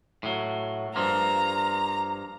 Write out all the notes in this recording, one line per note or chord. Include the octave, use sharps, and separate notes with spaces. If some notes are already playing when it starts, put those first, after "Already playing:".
A2 F#3
G2 F3 A#3 A#5